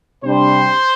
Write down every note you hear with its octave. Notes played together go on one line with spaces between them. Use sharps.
C3 G3 D4 C5